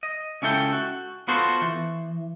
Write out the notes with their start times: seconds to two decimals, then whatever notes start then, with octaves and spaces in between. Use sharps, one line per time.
0.03 D#5
0.42 C#2 C#4 E4 A4 G5
0.73 F#4
1.28 B3 F4 F#4 A4 C5
1.61 E3